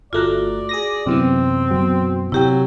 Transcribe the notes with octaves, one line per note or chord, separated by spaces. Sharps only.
G1 A3 F4 F#4 D5 A#5
G#4 D#6 A#6
F#2 C3 E3 B3 C4
B2 F#3
C3 F#3 E4 G4 G5